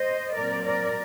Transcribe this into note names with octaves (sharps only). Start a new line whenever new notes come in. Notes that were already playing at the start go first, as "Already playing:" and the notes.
Already playing: C5 D#5
A#2 F#3 C4 A#4 D5
A#4 D5